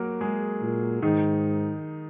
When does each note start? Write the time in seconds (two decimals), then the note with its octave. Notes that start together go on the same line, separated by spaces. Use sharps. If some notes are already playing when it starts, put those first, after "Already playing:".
Already playing: F#3 A#3 F#4 A#4
0.21 G#3 G#4
0.62 A#2
1.02 G#2 D#3 D#4